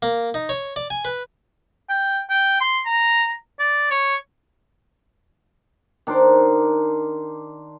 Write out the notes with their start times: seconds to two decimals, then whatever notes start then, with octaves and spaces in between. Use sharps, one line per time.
0.02 A#3
0.34 D#4
0.49 C#5
0.76 D5
0.90 G#5
1.05 B4
1.89 G5
2.30 G5
2.61 C6
2.86 A#5
3.59 D5
3.91 C#5
6.07 D#3 D4 A#4 C5